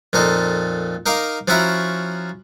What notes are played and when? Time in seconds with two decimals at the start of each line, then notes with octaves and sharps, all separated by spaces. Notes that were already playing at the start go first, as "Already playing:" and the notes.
0.13 F2 A#2 D#4 A4
1.06 D#4 A#4 F5 D6
1.48 F3 C#4 E4 F#4 E5 A#5